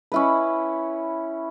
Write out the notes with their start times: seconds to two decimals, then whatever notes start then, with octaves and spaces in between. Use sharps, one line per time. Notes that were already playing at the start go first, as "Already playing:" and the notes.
0.12 C#4 E4 B4